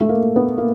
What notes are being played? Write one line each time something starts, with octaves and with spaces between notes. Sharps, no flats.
A3
A#3
B3
A#3